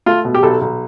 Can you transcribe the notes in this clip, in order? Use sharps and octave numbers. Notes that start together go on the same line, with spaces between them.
A3 F4
B2
G4
B1 A4
B1